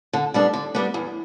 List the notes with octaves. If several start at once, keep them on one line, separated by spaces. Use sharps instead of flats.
D3
G3 B3 D4
D3
G3 B3 D4
E2